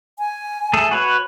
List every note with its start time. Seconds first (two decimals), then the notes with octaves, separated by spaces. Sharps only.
0.19 G#5
0.73 A3 G#4 A4
0.91 F#4 B4 C#5